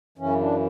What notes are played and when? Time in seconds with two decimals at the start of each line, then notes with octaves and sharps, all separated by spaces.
0.18 F#2 C#3 E3 C#4
0.40 D4